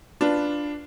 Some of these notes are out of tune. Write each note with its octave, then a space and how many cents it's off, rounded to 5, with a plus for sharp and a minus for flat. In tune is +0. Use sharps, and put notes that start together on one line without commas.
D4 +0 F4 +0 B4 +0